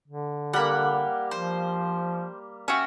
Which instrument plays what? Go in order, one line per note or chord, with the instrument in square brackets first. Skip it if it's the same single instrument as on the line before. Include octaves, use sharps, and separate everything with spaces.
[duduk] D3
[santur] G3 A#3 [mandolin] F#5 B5
[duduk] F3 [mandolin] C5
[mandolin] C#4 F#4 [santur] E5 G5